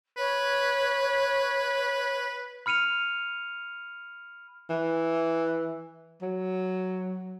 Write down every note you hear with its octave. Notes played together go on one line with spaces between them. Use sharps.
B4 C#5
B5 F6 C#7 D#7 F7
E3
F#3